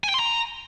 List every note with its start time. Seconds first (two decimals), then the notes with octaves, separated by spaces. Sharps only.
0.04 G#5
0.09 G5
0.14 C6
0.19 A#5